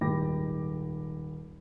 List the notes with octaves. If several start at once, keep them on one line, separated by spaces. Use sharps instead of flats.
D#1 G#2 G5 B5 D6 A#6